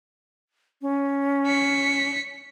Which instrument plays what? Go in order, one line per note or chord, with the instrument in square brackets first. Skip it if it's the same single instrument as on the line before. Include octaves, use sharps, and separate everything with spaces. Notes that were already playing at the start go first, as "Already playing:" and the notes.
[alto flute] C#4
[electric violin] B6 C#7